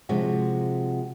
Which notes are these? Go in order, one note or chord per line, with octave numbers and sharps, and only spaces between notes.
C3 F3 G#3 F#4